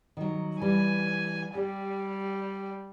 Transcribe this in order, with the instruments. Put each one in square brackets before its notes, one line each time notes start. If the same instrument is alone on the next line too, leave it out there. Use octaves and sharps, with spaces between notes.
[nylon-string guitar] D#3 F#3
[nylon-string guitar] E3 G3 [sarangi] G#5
[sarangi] G3 [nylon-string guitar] G4